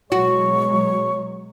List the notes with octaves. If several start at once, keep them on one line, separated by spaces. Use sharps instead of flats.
B2 F#3 G#3 F#4 C#5 C#6